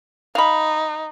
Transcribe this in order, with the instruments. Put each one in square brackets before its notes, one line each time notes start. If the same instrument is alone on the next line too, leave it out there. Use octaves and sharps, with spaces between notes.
[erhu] D#4 [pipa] F5 B5